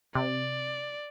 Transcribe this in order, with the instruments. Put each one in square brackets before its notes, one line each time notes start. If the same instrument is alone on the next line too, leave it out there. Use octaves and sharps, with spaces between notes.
[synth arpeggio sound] C3 [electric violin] D5